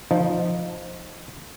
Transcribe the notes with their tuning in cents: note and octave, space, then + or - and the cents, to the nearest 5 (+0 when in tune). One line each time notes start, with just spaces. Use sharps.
F3 +0 D#4 +0